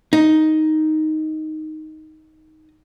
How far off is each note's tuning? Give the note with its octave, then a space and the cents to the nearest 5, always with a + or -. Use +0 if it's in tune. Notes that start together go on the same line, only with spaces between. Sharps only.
D#4 +5